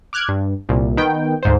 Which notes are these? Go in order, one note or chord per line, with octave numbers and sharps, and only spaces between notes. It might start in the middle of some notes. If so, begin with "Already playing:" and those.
D6 F6 F#6 G#6
G2
C2 A#2
D#3 B3 G5
D2 G#2 C5